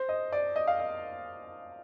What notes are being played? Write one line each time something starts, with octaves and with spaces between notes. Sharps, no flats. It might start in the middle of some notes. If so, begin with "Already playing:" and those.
Already playing: C5
D#5
D5
D#5
F5
D#5